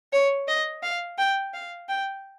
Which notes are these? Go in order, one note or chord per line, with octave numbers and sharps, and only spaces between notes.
C#5
D#5
F5
G5
F5
G5